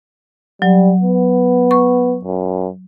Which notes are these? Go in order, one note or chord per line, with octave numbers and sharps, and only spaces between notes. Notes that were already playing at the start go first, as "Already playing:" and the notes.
F#3 G3
B3
C#6
F#2